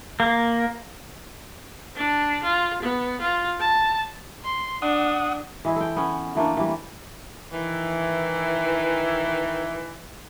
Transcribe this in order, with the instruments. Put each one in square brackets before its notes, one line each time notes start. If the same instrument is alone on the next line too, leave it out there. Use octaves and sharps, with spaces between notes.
[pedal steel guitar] A#3
[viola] D4
F4
B3
F4
A5
[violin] C6
[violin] D4 [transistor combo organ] F#5 D#6
[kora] E3 G#3 E4
A4 G5
B3 C#4
E3 A3 A#3 D4
E3 G3
[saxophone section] D#3 E3